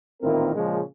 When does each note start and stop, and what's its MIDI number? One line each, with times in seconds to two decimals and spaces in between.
0.22 0.51 33
0.22 0.51 46
0.22 0.51 51
0.22 0.51 60
0.22 0.51 64
0.22 0.51 70
0.55 0.82 46
0.55 0.82 49
0.55 0.82 53
0.55 0.82 56
0.55 0.82 61